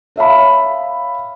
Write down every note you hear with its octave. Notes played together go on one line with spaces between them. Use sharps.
C#5 E5 F5 B5